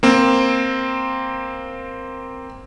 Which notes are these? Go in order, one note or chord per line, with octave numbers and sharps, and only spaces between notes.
A#3 C4